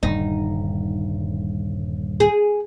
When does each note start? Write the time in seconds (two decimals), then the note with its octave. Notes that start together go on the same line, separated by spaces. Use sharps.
0.03 D#1 G2 D3 D#4
2.20 G#4